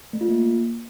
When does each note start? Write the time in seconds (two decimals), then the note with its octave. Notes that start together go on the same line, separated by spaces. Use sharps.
0.13 A3
0.21 F4
0.29 A#3